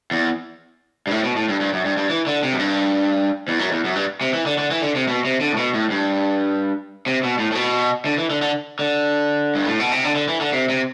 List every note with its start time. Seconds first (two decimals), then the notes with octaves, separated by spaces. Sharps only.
0.11 E2
1.07 G2
1.11 A2
1.23 B2
1.36 A2
1.48 G2
1.61 G2
1.73 F#2
1.85 G2
1.97 G2
2.10 E3
2.27 D3
2.43 C3
2.53 F#2
2.59 G2
3.48 E2
3.59 F#2
3.71 E2
3.84 F#2
3.96 G2
4.21 C3
4.33 E3
4.46 D3
4.58 D3
4.71 E3
4.82 D3
4.96 C3
5.08 B2
5.25 C3
5.41 D3
5.53 A2
5.57 B2
5.74 A2
5.90 G2
7.06 C3
7.23 B2
7.39 A2
7.52 A2
7.55 B2
8.05 D3
8.18 E3
8.30 D3
8.42 D3
8.79 D3
9.55 G2
9.66 A2
9.79 B2
9.92 C3
10.04 D3
10.15 D3
10.28 E3
10.41 D3
10.53 C3
10.69 C3